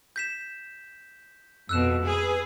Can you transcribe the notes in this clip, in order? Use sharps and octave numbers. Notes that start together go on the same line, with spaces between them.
G6 B6 E7
F2 B2 E6 F#6 E7
G#4 B4